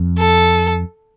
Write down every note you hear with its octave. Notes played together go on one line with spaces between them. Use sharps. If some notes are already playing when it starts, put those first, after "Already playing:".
Already playing: F2
A4